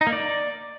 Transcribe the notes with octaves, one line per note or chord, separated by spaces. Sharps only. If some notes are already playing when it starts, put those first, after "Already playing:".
D#4
A#3
D5